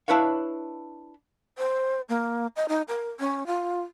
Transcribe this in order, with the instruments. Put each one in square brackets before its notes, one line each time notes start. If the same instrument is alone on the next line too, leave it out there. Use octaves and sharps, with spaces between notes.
[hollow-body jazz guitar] D4 E4 B4 C#5 F5
[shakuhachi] C5
A#3
D#5
D#4
A#4
C#4
F4